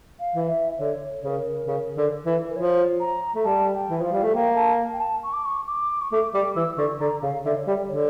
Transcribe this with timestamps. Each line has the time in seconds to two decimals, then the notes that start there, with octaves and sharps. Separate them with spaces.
0.20 F5
0.35 E3
0.48 E5
0.79 D3 C#5
1.22 C#3 A#4 C#5
1.67 C#3
1.97 D3
2.26 E3
2.49 A#4
2.56 F3 C#5
3.00 A#5
3.35 A3
3.45 G3 A5
3.74 G5
3.90 E3
4.01 F3 F5
4.12 G3
4.23 A3
4.34 A#3 G5
4.56 A5
4.93 G5
5.00 A5
5.23 C#6
5.33 D6
5.45 C#6
5.67 D6
6.02 C#6
6.12 A3 D6
6.34 G3 D6
6.56 E3 E6
6.78 D3 C#6
7.00 D3 A#5
7.22 C#3 F5
7.45 D3 E5
7.56 C#5
7.67 G3 D5
7.89 D3 C#5